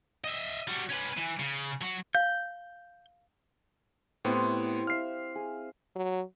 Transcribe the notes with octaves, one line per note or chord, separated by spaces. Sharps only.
D#5 E5
G3 F#4
C#4 B4
E3
C#3
F#3 F#4
F5 G6
A2 B3 C4 E4 G4
E5 F5 F6 C7
G#4
F#3